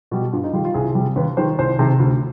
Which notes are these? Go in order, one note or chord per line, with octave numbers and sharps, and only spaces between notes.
B2 G3
G2 F4
D#4
D#3 G3 F4
F4
C2 G#4
C3 G3
D#2 B4
D#3 G3 C5
C2 C5
C3 D#3
D2